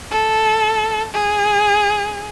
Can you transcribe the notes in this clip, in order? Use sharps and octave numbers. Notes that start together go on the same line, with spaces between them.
A4
G#4